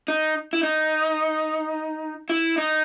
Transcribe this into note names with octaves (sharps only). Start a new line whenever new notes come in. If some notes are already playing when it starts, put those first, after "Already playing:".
D#4
E4
D#4
E4
D#4